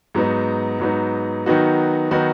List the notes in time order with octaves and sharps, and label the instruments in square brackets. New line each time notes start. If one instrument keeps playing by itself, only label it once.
[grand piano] G#2 F#3 B3 D#4
G#2 F#3 B3 D#4
D#3 F#3 B3 D#4 F#4
D#3 F#3 B3 D#4 F#4